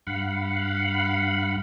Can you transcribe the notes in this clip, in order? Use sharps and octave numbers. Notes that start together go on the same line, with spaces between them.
G2 F5 F#5 B5